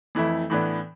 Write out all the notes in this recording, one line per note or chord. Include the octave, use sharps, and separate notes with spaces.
F2 E3 A3 E4
A2 E3 B3 D4